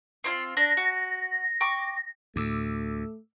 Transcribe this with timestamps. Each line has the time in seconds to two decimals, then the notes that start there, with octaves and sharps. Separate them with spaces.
0.24 C4 E4 F4
0.57 D4 A#6
0.77 F#4
1.61 G5 C#6 D6
2.36 D2 A2 A3 D6 E6